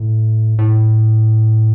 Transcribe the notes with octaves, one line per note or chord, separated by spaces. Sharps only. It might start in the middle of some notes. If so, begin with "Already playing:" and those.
Already playing: A2
A2